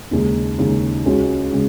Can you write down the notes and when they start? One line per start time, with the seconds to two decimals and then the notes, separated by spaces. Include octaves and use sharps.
0.11 D#2 C#3 G#3 D#4
0.58 D#2 C#3 G#3 D#4
1.06 C#2 C#3 G#3 C#4 F#4
1.53 C#3 G#3